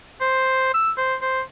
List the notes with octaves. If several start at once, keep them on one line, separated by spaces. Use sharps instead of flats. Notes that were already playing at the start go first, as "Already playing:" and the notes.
C5
E6
C5
C5